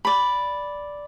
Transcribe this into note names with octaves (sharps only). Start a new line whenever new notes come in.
D5 B5